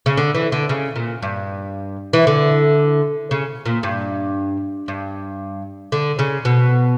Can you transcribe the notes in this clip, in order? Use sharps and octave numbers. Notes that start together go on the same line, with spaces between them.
C#3
D3
E3
D3
C#3
A#2
G2
E3
D3
C#3
A#2
G2
G2
D3
C#3
B2